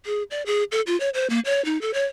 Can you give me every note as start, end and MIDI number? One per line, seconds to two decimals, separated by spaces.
0.06 0.23 68
0.31 0.42 74
0.46 0.63 68
0.72 0.81 69
0.87 0.98 65
1.00 1.09 73
1.14 1.27 72
1.30 1.40 58
1.45 1.63 73
1.65 1.80 63
1.81 1.92 69
1.94 2.05 73